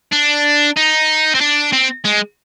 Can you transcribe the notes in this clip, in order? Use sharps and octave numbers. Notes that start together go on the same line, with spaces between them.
D4
D#4
C4
D4
C4
G#3